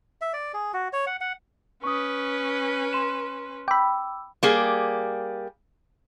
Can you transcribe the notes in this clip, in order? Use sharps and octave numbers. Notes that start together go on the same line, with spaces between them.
E5
D5
G#4
F#4
C#5
F#5
F#5
C#4 B4 C#6 D#6
C6 E7
G5 B5 D6 E6
G3 A#3 G#4